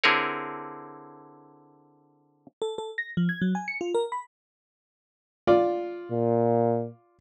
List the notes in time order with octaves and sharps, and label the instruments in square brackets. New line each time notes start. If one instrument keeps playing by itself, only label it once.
[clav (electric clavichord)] D3 C4 E4 G#4 A#4 C#5
[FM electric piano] A4
A4
A#6
F3
G#6
F#3
G#5
C#7
F4
A#4
B5
[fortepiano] F4 D5
[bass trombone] A#2